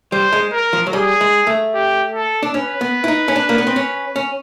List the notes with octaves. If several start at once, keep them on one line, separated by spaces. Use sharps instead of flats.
G3 C5
G#3
A#4
F3
F#3
G3 G#4
G#3
A3
G4
A4
D4
C#4 B4
B3
E4
D#4
C#4
D4
A#3
B3
C4
C#4
C#4